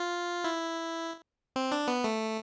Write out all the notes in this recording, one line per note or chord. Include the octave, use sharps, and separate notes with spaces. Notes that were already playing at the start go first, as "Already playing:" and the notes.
Already playing: F4
E4
C4
D4
B3
A3